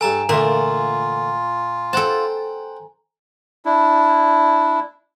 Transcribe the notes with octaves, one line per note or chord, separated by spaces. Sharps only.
G2 A4 G#5 A#5
A#2 D3 E3 A3 F4 A#5
A4 C5 F#5 G5 A5
D4 E4